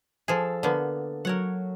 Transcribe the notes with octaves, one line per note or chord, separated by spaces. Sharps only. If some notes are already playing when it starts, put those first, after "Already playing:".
F3 G#4 A4 F5
D3 A#3 B3
F#3 A#4 C#5 F#5